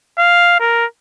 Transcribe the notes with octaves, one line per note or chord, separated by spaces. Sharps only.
F5
A#4